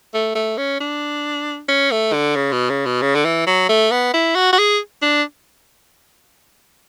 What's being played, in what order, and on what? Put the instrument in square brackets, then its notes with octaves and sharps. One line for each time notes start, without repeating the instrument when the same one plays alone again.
[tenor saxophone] A3
A3
C#4
D4
C#4
A3
D3
C#3
B2
C#3
B2
C#3
D3
E3
F#3
A3
B3
E4
F#4
F#4
G#4
D4